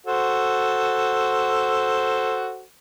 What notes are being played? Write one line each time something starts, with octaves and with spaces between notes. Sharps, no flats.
F#4 A4 C5